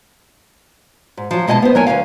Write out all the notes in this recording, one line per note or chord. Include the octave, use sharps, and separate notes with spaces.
G#2
F3 F#3
B2 G#3 D#5 E5 A5
B3 C5
F#3 A#4 C#5 G#5
D2 G#2 C#4 F5